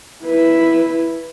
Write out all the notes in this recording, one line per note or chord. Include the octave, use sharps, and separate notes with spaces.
E4 B4